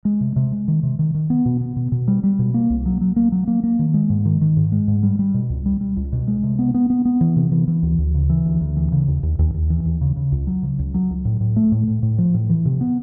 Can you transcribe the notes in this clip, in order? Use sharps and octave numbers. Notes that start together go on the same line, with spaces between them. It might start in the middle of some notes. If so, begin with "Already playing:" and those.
G#3
C3
C3
G#3
D#3
C3
D#3
D#3
B3
B2
B3
B2
B2
G3
G3
B2
A#3
C2
F#3
F#3
A#3
F#3
A#3
A#3
D#3
G#3
G#2
D#3
D#3
G#2
G#3
G#2
G3
G3
B2
C#2
G3
G3
C#2
B2
G#3
C3
B3
B3
B3
B3
E3
C3
E3
E3
D2
D2
C#3
E3
D2
D2
E3
C#3
D#2
D#2
D#2
D#2
E3
D#2
C#3
C#3
C#2
F#3
C#3
C#2
F#3
C#2
A2
A2
A3
A2
A2
A2
F3
A2
E3
C3
B3